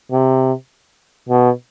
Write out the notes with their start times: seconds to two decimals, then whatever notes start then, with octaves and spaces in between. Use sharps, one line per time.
0.11 C3
1.29 B2